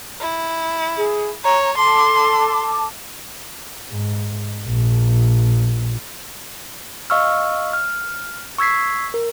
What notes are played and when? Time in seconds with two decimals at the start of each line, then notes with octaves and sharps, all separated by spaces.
0.21 E4
0.97 G#4
1.44 C#5 A#5
1.78 A4 A5 C6 D6
3.90 G#2
4.68 A#1
7.10 D#5 F5 C#6 E6 F6
7.73 F6
8.58 C#6 E6 G#6 B6 C7
9.14 A#4